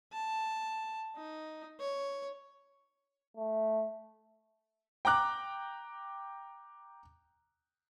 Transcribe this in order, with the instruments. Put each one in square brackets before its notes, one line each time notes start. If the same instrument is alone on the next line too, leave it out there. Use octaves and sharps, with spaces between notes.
[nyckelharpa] A5
D#4
C#5
[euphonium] A3
[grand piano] G5 A#5 D6 F#6